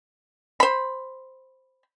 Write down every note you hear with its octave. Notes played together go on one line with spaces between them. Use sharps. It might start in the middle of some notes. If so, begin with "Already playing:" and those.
C5 B5